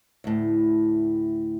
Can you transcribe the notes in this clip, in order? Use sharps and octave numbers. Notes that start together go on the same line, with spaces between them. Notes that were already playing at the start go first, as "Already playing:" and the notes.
D2 A2